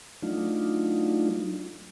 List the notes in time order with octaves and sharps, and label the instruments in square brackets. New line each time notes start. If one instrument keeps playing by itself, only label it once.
[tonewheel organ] F#3 A3 D4 D#4 F4